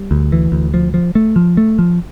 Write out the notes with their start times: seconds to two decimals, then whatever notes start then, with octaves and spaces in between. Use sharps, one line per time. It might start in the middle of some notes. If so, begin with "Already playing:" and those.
Already playing: G3
0.11 D2
0.32 E3
0.52 D2
0.74 F3
0.94 F3
1.15 A3
1.36 F3
1.57 A3
1.79 F3